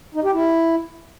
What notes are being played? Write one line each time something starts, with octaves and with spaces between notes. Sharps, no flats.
D#4
G4
E4